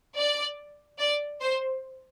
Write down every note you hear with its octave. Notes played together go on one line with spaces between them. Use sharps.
D5
D5
C5